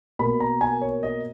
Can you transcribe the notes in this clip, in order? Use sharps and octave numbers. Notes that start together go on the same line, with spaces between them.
B2 A#3 B5
A#5
G#5
C#5
D#5